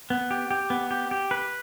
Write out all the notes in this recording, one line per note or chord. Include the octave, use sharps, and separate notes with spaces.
B3
G4
G4
B3
G4
G4
B4